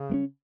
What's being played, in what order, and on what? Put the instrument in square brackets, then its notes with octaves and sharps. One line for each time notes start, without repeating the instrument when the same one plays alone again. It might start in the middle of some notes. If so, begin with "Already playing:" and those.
Already playing: [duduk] C#3
[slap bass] G3 A#3 C#4